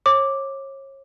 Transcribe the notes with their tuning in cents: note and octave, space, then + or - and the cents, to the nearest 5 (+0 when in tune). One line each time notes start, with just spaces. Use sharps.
C#5 -35 D6 +0